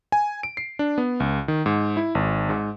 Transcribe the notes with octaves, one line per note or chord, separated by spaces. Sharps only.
G#5
D7
C7
D4
B3
C#2
D#3
G#2
E4
G#1
G#2